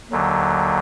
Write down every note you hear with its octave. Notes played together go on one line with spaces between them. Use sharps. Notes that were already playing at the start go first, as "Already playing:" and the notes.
D#2 D3 F#3